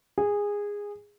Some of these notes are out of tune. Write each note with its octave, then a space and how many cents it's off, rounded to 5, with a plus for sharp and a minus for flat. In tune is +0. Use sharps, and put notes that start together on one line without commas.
G#4 -15